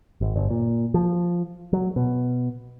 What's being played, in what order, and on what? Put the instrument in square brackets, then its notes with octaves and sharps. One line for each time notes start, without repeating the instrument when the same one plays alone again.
[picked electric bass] G#1
G1
A#2
F3
F#3
B2